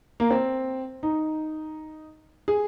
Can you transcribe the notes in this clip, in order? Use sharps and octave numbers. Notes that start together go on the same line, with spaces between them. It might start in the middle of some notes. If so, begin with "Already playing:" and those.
A#3
C4
D#4
G#4